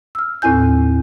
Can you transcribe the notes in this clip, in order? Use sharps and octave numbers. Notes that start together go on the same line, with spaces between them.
E6 F6
D#2 A2 C4 E4 G#5 G6